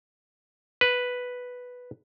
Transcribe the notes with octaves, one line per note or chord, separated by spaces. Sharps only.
B4